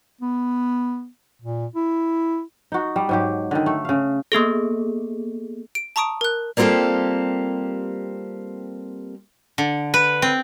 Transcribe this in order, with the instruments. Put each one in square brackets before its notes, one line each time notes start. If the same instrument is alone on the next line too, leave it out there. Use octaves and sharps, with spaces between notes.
[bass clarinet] B3
A#2
E4
[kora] D#4 F#4
G3
G#2 F#3 G4
D3 D#3
A3
C#3 F5
[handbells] A#3 B3 G#4 A4
[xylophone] D7
A5 A#5 C#6 D#6 D7
A#4 F#6
[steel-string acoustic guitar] G3 A#3 C4 F4 G4 A4
[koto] D3
B4
C4